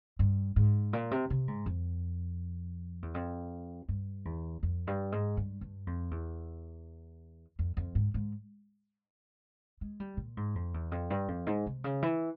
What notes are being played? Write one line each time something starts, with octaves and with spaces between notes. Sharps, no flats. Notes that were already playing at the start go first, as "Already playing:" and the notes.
G2
G#2
A#2
C3
C3
G#2
F2
E2
F2
G2
E2
F2
G2
G#2
G2
G2
F2
E2
F2
F2
G#2
G#2
G#3
G3
A#2
G#2
F2
E2
F2
G2
F2
G#2
C3
C#3
E3